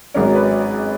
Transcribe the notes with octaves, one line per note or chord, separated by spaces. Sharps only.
G#1 G#2 F#3 C#4 A#4
B4